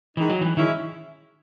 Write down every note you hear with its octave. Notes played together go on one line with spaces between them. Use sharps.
D#3 E3 G#3 D#4
F#3
E3
D#3 G#3 C#4 E4